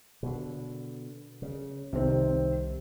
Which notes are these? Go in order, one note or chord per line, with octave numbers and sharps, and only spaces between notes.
B2 D3
C#3
C2 C3 D#3 C4